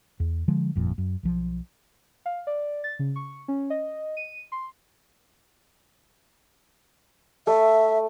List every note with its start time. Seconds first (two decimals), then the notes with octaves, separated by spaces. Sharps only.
0.20 E2
0.48 D3 F3 G#3
0.75 G1 F2 A#2
0.98 F#2
1.23 B1 F3
2.26 F5
2.47 D5
2.84 A6
2.99 C#3
3.16 C#6
3.48 C#4
3.70 D#5
4.17 D#7
4.52 C6
7.47 A3 E5